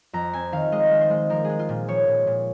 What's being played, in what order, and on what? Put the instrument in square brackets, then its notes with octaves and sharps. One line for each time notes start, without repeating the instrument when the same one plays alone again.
[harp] F2 A#5
C4 G#5
D#3 F5
G#3 D#5
G#3
C5
G#3
F3 A#4
G#3 G#4
F4
A#2
F3 C#5
A#2
A#2